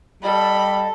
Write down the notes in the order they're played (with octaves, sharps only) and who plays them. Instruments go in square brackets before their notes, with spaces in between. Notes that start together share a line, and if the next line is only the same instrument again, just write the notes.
[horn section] G3 [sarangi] A4 [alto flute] D#5 [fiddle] B5